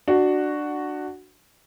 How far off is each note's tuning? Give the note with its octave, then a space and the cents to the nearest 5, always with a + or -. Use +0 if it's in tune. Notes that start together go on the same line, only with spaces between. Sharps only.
D4 +15 F#4 +0